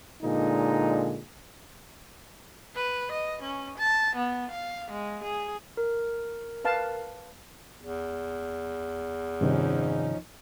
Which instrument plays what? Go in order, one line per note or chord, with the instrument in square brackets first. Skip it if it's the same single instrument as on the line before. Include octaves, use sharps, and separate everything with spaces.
[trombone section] A#2 D3 G#3 D#4
[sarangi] B4
D#5
C#4
A5
B3
F5
G#3
G#4
[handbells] A#4
[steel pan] B4 F5 A5
[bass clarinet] E2
[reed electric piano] G2 C3 D#3 [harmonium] F3 C#4 D#4